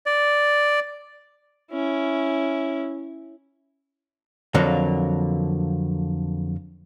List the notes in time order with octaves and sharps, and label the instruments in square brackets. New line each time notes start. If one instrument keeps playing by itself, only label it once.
[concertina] D5
[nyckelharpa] C#4 E4
[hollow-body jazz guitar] F2 D3 F#3 A#3